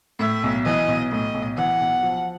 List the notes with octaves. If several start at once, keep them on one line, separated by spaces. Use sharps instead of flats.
A2 E5
B1
E3 D#5
B1
A2 D#5
B1
E3 F#5
B1
F3